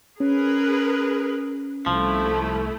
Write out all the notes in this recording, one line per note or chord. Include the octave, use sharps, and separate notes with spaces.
C#4 G#4 A#4 B4
C2 F3 A3 E4